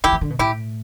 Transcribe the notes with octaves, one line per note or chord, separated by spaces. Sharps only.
D3 E4 G4
E3
D3
B2
A2 E4 G4